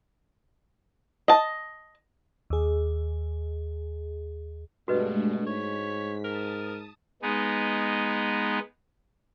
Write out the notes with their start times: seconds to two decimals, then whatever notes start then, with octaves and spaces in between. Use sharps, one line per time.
1.28 D#5 A5
2.50 D#2 G#4
4.88 G2 B2 G#3 A3 D4 F#4 B4 D#5
5.46 G#2 C#5 B6
6.24 A#4 A5 D#6
7.22 G#3 B3 D#4